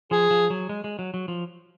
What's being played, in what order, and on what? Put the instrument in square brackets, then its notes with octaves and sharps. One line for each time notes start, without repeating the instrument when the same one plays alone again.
[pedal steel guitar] F3 [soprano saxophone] G#4
[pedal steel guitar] F3
F#3
G#3
G#3
F#3
F#3
F3